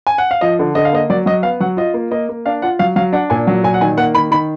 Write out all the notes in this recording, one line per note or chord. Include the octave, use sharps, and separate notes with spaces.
G#5
F#5
F5
F3 D#5
D3
D3 D#5
F5
A#3 D#5
F#3 D5
F#3 D#5
B3 F5
F#3 F#5
F4 D#5
A#3
A#3 D#5
A#3
D4 F5
F4 F#5
F#3 F5
F#3 F5
D4 F#5
A#2 G#5
F#3
A#2 G#5
F#5
D#3 G#5
A#3 F#5
D#3 B5
D#3 B5